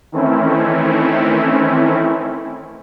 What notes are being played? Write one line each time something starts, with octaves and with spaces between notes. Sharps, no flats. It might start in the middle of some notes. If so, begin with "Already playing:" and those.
D#3 E3 A3 C4 C#4 E4